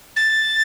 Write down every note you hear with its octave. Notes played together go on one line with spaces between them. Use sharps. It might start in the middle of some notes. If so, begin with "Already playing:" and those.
A6